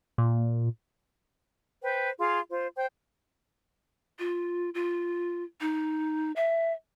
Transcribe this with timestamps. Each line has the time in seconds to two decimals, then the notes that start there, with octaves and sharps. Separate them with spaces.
0.18 A#2
1.82 B4 C5 G5
2.19 F4 G#4 F5 C6
2.50 F4 C5
2.76 C5 G5
4.19 F4
4.74 F4
5.61 D#4
6.36 E5